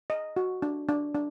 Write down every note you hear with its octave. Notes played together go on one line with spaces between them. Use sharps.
D#5
F#4
D4
D4
D4